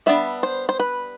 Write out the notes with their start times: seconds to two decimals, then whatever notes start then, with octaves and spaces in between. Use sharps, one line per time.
0.06 G3 B3 D4 E5
0.43 C5
0.69 C5
0.80 B4